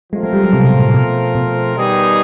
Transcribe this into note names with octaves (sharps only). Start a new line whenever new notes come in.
F3 G#3 A3 C4 F4 A#4
G#3
G3
F#3
C3
B2
A2
A2
B2
B2
D#3 G3 B3 D#4 G#4